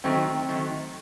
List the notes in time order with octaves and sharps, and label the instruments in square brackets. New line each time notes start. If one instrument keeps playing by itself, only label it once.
[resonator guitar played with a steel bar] D#3 F#3 A3 [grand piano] C4
[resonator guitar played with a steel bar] D#3 F#3 A3